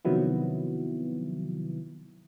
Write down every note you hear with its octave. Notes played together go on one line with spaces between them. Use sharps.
C3 D#3 F3 F#3 B3 E4